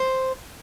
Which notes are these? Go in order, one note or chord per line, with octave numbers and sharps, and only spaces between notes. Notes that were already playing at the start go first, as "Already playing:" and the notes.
Already playing: C5